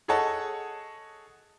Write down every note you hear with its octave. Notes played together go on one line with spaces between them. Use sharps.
G#4 A4 C#5 D#5 F#5 A5